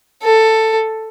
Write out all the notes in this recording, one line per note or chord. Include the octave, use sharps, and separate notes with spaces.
A4